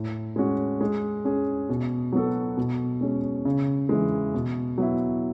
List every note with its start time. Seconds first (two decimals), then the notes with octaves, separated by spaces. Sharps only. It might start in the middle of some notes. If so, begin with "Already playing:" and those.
Already playing: A2
0.36 G#3 C#4 F#4
0.81 G#3
1.25 C#4 G#4
1.69 B2
2.13 F#3 B3 F#4 A4
2.57 B2
3.01 G#3 C#4
3.45 C#3
3.89 E3 G#3
4.34 B2
4.78 F#3 B3 E4